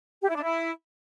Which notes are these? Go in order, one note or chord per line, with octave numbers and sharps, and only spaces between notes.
G4
E4
D4
E4